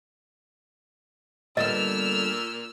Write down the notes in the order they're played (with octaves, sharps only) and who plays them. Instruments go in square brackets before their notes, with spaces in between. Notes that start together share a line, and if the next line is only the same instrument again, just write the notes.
[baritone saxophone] A#2 [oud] D3 G3 B3 [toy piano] D#5 [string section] E6 F6